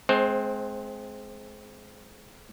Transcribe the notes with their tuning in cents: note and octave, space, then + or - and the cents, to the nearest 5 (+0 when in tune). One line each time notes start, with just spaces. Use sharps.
G#3 +30 C4 +0 C5 +25